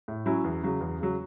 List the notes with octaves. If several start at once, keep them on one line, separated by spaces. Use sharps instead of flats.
A2
F#3 C#4 E4
E2
C#3 F#3
E2
C#3 F#3